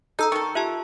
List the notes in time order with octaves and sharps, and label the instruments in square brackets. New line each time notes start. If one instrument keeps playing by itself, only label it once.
[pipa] D#4 [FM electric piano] A4 D#6 [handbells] A#5 E6 G6
[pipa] D#3 A4 [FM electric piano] C#6
[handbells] F4 G4 A5 [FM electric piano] E5